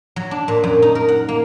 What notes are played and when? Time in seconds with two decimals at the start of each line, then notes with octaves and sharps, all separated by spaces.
0.16 F#3
0.31 D4
0.48 A#2
0.64 F#2
0.82 D#4
0.95 A#4
1.08 F#5
1.28 A#3